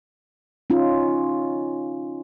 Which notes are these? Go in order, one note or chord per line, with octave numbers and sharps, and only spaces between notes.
C#4 D#4 F4